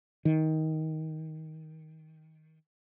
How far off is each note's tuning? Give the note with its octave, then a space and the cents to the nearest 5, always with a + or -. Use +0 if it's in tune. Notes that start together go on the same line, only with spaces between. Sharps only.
D#3 +20